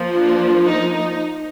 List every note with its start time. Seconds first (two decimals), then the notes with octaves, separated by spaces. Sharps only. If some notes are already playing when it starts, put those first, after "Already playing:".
Already playing: F3 A#3
0.18 D4
0.66 D#4
0.97 D#4